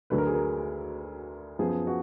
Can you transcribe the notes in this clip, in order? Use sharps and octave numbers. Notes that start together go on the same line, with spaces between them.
D2 D3 F#3 B4
A#4
G#4
A#4
F#2 F3 B3 G#4
G#4
F#4